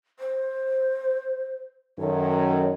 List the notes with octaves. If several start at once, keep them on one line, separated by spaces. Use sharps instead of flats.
C5
F#2 D#3 A4 C#5